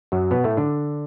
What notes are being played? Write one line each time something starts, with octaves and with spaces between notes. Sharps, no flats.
F#2 F#3
B2 B3
A2 A3
D3 D4